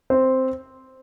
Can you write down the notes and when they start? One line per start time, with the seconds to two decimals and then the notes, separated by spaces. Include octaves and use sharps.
0.10 C4 C5